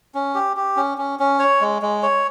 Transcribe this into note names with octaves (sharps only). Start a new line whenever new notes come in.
C#4
G4
G4
C#4
C#4
C#4
C#5
G#3
G#3
C#5